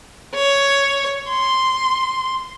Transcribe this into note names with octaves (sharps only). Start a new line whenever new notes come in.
C#5
C6